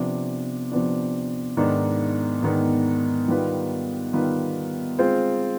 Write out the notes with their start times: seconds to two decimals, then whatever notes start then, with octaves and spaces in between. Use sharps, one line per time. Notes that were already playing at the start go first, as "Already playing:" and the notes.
Already playing: C3 F3 B3 D4
0.72 C3 F3 B3 D4
1.57 G#2 D#3 B3 D4
2.42 G#2 D#3 B3 D4
3.28 D#3 G3 B3 F4 B4
4.13 D#3 G3 B3 F4 B4
4.99 G#3 C4 F4 C5